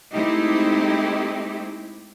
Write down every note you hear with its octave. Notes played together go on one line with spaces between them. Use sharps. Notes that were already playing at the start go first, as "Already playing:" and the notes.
G#3 A3 C4 D#4 E4 G4